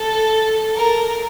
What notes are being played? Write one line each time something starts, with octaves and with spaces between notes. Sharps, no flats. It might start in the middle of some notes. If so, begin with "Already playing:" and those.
Already playing: A4
A#4